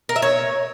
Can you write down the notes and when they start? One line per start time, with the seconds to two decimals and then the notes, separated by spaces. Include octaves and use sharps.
0.09 A#4
0.16 E5
0.22 C#5